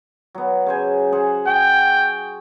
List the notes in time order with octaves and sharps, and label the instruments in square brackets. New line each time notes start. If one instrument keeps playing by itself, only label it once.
[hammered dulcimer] F#3 B3
C#3 C5 G#5
G#4 C5 F#5
[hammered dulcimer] F#4 [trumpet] G5